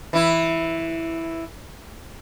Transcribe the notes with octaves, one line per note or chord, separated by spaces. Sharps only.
E3 E4